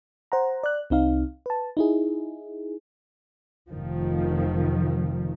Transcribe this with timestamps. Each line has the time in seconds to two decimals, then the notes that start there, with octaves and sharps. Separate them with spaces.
0.32 C5 F#5 A#5
0.63 D5 F#6
0.90 C2 C4 D#4 F5
1.46 B4 A5
1.77 D#4 E4 G#4
3.70 F1 D#3 F3